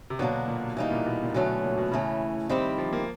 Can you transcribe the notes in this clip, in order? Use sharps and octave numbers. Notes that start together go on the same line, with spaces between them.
C3
B2 D3 F#3 A#3 D4
A#2
B2 E3 G3 A#3 D#4
A#2
B2
A#2
D2 B2 D3 F#3 A3 C#4
A#2
B2
A2 C#3 E3 A3 C#4
D#3 G3 C4 E4 G4
F3
A#3